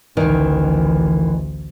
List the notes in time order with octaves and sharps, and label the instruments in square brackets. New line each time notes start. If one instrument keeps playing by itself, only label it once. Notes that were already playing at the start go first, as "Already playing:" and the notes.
[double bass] A1 D2 [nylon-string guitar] D#3 E3